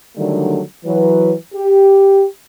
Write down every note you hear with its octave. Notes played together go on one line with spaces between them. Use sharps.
D3 D#3 F#3 G3 A3 D4
E3 F#3 B4
G4